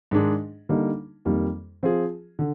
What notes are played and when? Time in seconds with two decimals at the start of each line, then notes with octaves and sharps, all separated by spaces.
0.11 G#2 D#3 G#3 D4 G#4
0.69 D3 G3 A#3 D#4
1.25 F2 D#3 G3 A#3
1.83 F3 C4 F4 G#4
2.39 D3